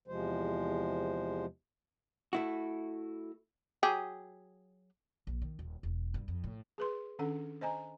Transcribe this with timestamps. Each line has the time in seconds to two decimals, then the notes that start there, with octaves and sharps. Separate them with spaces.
0.08 E2 C3 F3 G#3 C5
2.33 A3 E4 F#4
3.83 F#3 G4 G#4
5.27 A#1
5.42 D#3
5.59 D#1
5.83 E1
6.14 G2
6.28 F2
6.44 A2
6.78 G#4 B4 C6
7.19 D#3 C#4 D4 A4 F#5
7.61 C5 D#5 G#5 A#5